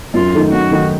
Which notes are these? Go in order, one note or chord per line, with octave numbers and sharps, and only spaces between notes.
F#2 F4
D#3 A3 D#4
F#2 F#4
D#3 A3 D#4